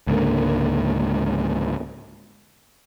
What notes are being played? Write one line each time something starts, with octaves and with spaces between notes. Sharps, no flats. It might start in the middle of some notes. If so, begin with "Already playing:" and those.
C#2 G#2 D3 A#3